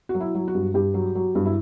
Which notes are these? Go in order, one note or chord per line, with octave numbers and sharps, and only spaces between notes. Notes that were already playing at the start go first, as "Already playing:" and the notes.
F#4
F#3
E4
F#3
F#4
G2
G2 G4
F#3
F#3
G2
E4